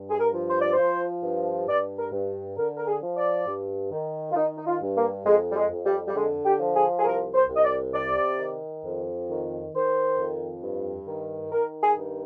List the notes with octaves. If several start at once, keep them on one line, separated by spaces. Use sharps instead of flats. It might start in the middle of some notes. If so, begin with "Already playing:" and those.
Already playing: G2
G#4
A#4
F3
C5
D5
C5
F3
G2
G2 D5
A#4
G2
D3 A#4
A#4
G#4
F3
D5
G2
D#3
F4
D#3 D#4
D#4
F4
G2
A#3
F2 G#3
G3
G#3
F2
G3
G3
D3 G#3
G4
F3
G#4
G#4
C2 A#4
C5
C2
D#5
D5
C3 D5
D#3
F2
D#3
D#3 C5
F2
G2
D#3
D#3 A#4
G#4
G2